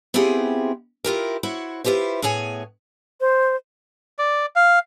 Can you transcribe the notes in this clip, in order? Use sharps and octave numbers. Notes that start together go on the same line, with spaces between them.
B3 C4 E4 F4 G4 G#4
E4 F4 G4 A#4
E4 F#4 C5 C#5
E4 F4 G4 B4 C5
A2 B3 G#4 C#5 G#5
C5
D5
F5